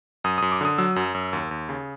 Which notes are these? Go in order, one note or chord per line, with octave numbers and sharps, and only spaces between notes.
F#2 D#6
D#6
F#2
D6
D3 D#6
F#3 E6
F#2
F#2
D#2
D#2
C#3